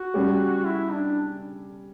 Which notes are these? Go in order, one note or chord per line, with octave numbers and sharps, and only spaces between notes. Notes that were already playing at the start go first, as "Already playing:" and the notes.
Already playing: F#4
G3 C#4 G4
E4
D4